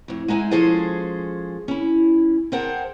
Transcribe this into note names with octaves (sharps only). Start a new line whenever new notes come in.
F2 A2
G#3 D#4 E4 F#5 G#5
F3 G#3 C#4 G#4 A4 C5
C#4 E4
G#4 A#4 C5 F#5 G5 A5